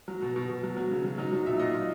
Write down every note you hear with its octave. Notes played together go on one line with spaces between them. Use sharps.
F#3
B2
B2
B2
F#3
F#3
C#3
F#3
F#3 D#4
F#3
A#2 E5
A#2 D#5
A#2